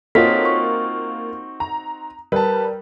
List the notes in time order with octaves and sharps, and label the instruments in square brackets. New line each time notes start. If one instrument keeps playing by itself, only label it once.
[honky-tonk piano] A#3 F4 [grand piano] C4 D#4 F#4 [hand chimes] A4 C#5 B6
[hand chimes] C#6
[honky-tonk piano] A#5
[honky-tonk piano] G3 [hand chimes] A#4 [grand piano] B4 A5